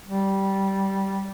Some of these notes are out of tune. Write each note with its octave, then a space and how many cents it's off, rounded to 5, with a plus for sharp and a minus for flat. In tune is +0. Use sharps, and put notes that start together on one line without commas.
G3 -10